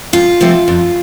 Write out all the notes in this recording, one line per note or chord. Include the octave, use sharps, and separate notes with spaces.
F2 F4
C3 F3 A3 C4
F2